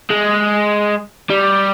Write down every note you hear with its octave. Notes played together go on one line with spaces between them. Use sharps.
G#3
G3